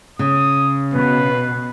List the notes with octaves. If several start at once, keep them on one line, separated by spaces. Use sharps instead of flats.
C#3 D#6
B2 B4